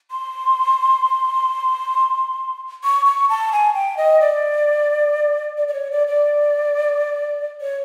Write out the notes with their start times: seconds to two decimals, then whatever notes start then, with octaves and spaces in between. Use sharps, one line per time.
0.11 C6
2.84 C#6
3.06 C#6
3.29 A5
3.52 G#5
3.74 G5
3.97 D#5
4.21 D5
5.57 D5
5.68 D5
5.73 C#5
5.91 D5
6.07 D5
7.61 C#5